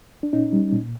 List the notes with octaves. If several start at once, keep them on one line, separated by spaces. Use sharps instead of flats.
D4
A#2 C#4 D#4
G3
A#2